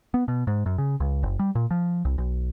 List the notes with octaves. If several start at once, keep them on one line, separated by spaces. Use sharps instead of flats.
B3
B2
G#2
F#2
C#3
C#2
F#1
G3
A#2
F3
C2
B1